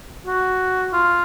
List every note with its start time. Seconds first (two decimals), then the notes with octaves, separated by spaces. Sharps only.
0.26 F#4
0.93 F4